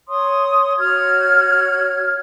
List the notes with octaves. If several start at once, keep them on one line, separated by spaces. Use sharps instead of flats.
C#5 C6 D#6
F#4 C#5 F6 G#6